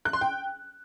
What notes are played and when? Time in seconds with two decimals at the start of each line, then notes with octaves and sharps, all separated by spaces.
0.05 F#6
0.13 C6
0.21 G5